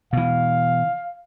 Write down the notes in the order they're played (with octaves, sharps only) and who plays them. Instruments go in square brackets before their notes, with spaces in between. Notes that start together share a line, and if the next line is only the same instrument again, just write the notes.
[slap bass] B2 E3 [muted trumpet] F5